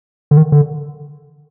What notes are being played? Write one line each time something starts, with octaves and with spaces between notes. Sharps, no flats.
D3
D#3
D3